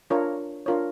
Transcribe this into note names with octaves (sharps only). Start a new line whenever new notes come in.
D4 F4 A#4 C#5
D4 F4 A#4 C#5